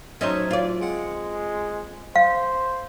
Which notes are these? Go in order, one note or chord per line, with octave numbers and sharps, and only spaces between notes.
F#3 C#4 D#4 A4 C5 E5
F4 D5
G#3 C4 F#5
C5 F5